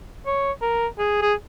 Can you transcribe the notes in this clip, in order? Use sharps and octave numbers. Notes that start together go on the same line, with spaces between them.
C#5
A#4
G#4
G#4